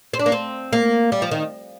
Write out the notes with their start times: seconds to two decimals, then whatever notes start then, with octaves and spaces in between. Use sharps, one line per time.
0.13 C4
0.19 D4
0.26 A#3
0.32 C4
0.73 A#3
1.12 G3
1.22 F3
1.31 D#3